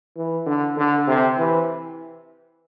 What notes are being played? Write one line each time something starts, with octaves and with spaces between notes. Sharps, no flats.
E3
D3
D3
C3
E3